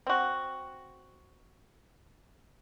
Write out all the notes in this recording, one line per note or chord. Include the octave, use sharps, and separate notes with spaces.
C4 F#4